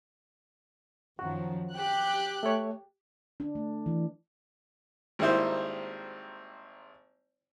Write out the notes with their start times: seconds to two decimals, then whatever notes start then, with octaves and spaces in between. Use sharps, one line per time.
1.19 F#2 D#3 F3 F#4
1.72 G4 F#6
2.43 A3 C#5
3.40 D4
3.55 A3
3.86 E3
5.19 G#1 G3 A#3 D#4 E4 C5